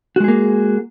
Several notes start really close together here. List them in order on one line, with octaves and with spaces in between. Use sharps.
F#4 G#3 G#4 A#3